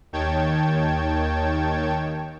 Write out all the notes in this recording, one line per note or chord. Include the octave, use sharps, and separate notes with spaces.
D#2 D#3 C#5 G5 A5 G#6